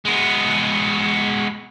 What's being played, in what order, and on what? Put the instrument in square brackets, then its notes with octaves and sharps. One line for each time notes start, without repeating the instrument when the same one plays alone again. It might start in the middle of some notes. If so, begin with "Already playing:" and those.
[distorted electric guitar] G#3 B3